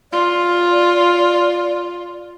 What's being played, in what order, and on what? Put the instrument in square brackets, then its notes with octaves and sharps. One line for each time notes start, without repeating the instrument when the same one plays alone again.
[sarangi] F4 [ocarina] D5